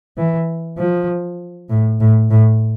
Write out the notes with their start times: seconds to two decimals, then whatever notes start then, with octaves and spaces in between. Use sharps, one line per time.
0.17 E3
0.78 F3
1.70 A2
2.00 A2
2.31 A2